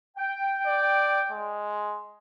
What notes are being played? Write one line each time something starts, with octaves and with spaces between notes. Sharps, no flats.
G5
D5
G#3